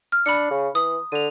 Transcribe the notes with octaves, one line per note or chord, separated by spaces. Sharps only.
F6
D4 B5 C#7
C#3
E3 D#6
D3 D#7 F7